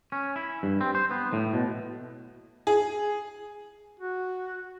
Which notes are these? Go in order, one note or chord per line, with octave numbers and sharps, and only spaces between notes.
C#4
E4
G2
C4
C5
B3
A2
B2
G#4
F#4